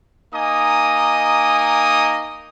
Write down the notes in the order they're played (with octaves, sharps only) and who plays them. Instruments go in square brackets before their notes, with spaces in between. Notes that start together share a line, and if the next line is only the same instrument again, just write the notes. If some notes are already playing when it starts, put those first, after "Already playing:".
[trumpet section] A#3 D#4 D#5 G#5 D6 D#6